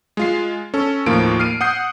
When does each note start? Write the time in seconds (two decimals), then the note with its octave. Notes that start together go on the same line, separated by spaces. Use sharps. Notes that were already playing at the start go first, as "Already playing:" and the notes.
0.17 G#3 F4 C7
0.74 C#4 A4
1.06 D#2 A2 F3 A#3 F4 D7
1.40 F6 C7 D7 D#7
1.61 F#5 D#6 G6 C7